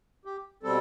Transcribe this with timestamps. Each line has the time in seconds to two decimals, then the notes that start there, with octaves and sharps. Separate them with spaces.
0.25 G4
0.63 B2 G3 C4 A4